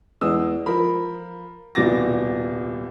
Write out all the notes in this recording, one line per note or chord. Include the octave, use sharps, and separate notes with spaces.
E2 G#3 D#6 E6
F3 A#4 B5
D#1 C2 B2 D6 A6 A#6